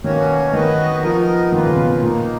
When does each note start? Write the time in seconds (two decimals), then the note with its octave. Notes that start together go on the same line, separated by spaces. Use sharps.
0.04 B2 D#3 A#3 C#4 F#4 C#5
0.53 D#3 B3 F#4 B4 D#5
1.02 F3 B3 D#4 A#4 D#5
1.52 D#3 A#3 F4 B4
1.66 C#3
1.76 B2
2.01 A#2 D#3 A#3 D#4